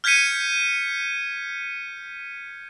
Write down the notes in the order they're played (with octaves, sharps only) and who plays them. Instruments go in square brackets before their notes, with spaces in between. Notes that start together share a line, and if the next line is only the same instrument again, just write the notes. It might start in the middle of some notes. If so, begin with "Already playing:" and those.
[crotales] F6 G6 G#6 B6 C#7 D#7